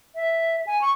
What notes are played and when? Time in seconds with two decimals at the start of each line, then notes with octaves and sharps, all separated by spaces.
0.15 E5
0.67 G#5
0.82 C#6